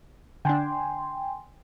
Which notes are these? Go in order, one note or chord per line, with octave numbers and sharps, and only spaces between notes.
D3 D4 G5 G#5 C6